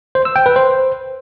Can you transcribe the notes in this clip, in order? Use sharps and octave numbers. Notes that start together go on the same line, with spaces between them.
C5
E6
G5
B4
C5